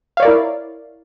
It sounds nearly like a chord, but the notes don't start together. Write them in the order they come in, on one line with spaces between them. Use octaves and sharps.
F5 C#5 D5 A#4 E4